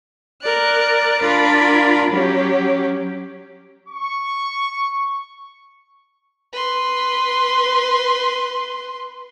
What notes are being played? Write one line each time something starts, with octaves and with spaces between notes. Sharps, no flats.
A#4 D5 F#6
D4 F4 A#4 D5 B5
F#3 C#4 G4
C#6
B4 C6